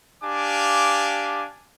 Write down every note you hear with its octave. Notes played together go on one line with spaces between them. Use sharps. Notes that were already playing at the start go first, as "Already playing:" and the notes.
D4 G4 F5 G#5 D6